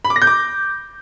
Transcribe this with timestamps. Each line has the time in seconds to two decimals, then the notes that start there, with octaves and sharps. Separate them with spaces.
0.05 B5
0.10 D6
0.16 A#6
0.22 G6
0.27 D6